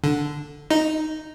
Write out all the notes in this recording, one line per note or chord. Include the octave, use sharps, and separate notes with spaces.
D3
D#4